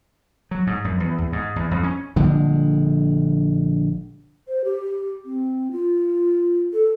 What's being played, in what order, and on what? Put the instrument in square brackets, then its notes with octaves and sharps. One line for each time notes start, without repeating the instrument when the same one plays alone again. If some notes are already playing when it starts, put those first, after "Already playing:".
[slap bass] F#3
G#2
F#2
E2
E2
G#2
E2
F2
C#4
A#1 D3 G3 G#3
[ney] C5
G4
C4
F4
A4